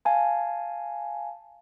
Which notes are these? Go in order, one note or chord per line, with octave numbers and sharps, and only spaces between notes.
F5 G#5 A5